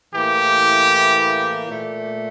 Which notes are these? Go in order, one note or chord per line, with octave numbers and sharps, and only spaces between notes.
A2 E3 A#3 G4
A#2 A3